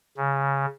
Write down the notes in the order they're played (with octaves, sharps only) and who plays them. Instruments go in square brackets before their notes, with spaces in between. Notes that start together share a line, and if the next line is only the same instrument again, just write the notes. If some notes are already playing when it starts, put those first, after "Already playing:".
[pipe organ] C#3